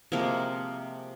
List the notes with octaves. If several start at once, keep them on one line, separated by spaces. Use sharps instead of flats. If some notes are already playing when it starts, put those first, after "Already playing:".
C3 F3 G#3 A#3 A#4